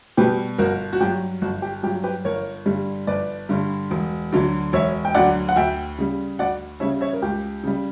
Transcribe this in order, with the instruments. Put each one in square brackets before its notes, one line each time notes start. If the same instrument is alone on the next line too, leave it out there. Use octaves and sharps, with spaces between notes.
[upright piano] B2 G3 G4 B4
G1 F#4 A#4
F#4
G2 F#3 G4
G1 F#4
G4
G2 G4
F#3
G4 B4
G1 A#4 C#5
G2 D3 G3
G1 B4 D5
G2 D3 G3
E1
D2 D3 F#3
E1 C#5 E5
G5
D2 D3 F#3 D5 F#5
F#5
D2 E5 G5
C#3 G3
D2 D5 F#5
C#3 G3 C#5 E5
C#5 E5
A#4
C#2 G4
C#3 G3